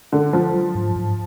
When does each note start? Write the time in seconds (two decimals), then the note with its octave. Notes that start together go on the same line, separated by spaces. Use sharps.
0.12 D3 D4
0.33 F3 D4
0.53 F#3
0.75 G#2
0.96 G#2